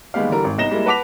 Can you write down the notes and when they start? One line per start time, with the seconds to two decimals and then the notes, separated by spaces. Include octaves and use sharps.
0.14 D#2 G3 G#3 B3 G4 F5
0.30 D3 E3 G3 A#4 A#5
0.44 G#1
0.58 C2 B3 D#4 A#6 E7 G7
0.71 G3 G#3 A#3 E4
0.86 B4 F#5 A5 D6 B6 F7